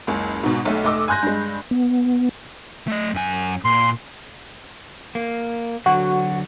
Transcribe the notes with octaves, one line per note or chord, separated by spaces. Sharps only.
F#1 C#2
G#2 B2
B1 A3
F1 A3 D#5 D6 E6
G#5 C6 F#6 G6 A#6
G2 G#3
B3
A3 D#5
F#2 G#5
A#2 C6
A#3
D3 F#3 F#4